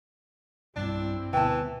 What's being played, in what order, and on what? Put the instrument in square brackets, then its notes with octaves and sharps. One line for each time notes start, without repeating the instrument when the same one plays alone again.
[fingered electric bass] B1 G2 [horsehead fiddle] C4 E4 [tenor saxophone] D4
[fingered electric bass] D2 B2 [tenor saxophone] E3 [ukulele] G5 A5